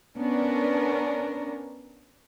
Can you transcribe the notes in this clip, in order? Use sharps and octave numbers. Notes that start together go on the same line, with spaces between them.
B3 C#4 D4 A#4